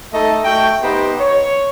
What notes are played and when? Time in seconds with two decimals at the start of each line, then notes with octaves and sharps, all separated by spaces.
0.13 A3 D#4 A4 D#5
0.44 A3 F#4 G5
0.82 B3 D#4 G4 C5
1.19 C#5